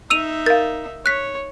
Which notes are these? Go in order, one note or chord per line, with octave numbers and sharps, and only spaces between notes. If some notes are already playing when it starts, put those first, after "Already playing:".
D#4 E5 E6 D#7 F7
A#4 F5 A6
C#5 F#6 B6